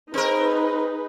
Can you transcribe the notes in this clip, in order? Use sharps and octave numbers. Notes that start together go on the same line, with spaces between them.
C4 D#4 G#4 A#4 B4